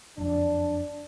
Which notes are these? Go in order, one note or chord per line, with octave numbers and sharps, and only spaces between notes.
F#1 F2 D4